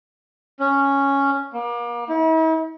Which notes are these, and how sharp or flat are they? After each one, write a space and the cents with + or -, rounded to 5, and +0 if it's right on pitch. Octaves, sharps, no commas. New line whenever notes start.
C#4 +0
A#3 +35
E4 -45